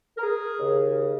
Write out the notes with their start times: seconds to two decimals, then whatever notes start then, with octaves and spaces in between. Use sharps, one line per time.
0.17 A#4
0.22 G#4
0.58 D#2 C#3